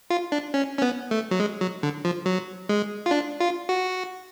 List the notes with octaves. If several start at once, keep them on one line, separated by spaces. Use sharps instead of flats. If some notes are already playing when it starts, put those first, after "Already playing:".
F4
D4
C#4
C#4
B3
A3
F#3
G#3
F#3
D3
F3
F#3
G#3
F4
D4
F4
F#4